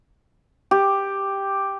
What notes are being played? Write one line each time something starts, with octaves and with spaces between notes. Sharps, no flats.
G4